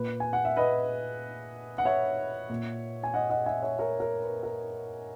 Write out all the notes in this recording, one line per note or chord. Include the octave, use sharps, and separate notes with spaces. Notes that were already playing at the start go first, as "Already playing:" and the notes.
Already playing: A#2 B4
G#5
F#5
E5
B4 D#5
F#5
C#5 E5
A#2
G#5
D#5 F#5
D#5 F#5
E5 G#5
C#5 E5
A#4 C#5
A#4
B4
A#4